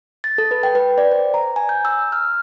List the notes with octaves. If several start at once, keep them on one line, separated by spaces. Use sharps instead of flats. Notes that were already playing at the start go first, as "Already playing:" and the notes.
A6
A4
B4
G5
B4
D5
C5
A#5
G#5
G6
E6
F6